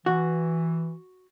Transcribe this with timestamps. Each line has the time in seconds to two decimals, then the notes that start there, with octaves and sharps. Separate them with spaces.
0.06 E3 F#4